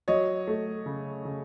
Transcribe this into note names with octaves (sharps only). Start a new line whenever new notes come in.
F#3 C#5 D#5
A3
C#3
C#3